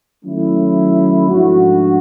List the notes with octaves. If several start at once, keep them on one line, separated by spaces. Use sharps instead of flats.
D#3 F#3 A3 C#4 E4
G#2 F3 A3 D4 F#4